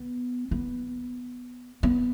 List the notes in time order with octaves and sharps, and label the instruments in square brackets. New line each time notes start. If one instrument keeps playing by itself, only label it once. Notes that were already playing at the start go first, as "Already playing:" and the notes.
Already playing: [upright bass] B3
B3
B3